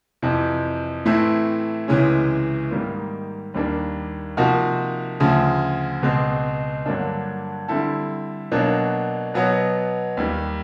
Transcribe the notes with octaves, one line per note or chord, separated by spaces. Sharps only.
F2 C3 E3
A2 E3 A3 C4 E4
C#2 C3 E3 G#3 C#4
G#2 D#3 G3 A#3
D#2 D#3 G3 A#3 D4
C3 F3 A#3 D#4 F#4
D2 C#3 F3
C#2 B2 G#3 C4
G2 D3 F#3 A#3 D4
D3 G3 C4 E4 A4
B2 F#3 A#3 D4
B2 F#3 B3
D#2 D#3 G3